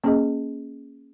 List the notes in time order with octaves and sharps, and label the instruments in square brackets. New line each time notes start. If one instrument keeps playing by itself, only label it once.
[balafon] A#3 C#4 G#4 D#5